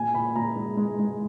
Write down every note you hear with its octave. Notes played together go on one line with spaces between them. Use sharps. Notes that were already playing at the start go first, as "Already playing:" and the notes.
Already playing: A#2 G#5
A#2 B5
A#2 A#5
G#3
G#3
G#3